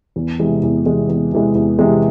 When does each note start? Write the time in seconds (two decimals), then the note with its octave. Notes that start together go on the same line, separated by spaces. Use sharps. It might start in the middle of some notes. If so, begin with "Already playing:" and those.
0.16 E2
0.39 C3 E3 G#3
0.63 E2
0.86 C3 E3 G#3
1.09 E2
1.32 C3 E3 G#3
1.55 E2
1.79 C3 E3 G#3